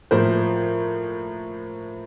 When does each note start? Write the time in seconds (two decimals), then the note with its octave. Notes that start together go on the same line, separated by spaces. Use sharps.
0.11 A2 F3 A#3 A#4 C5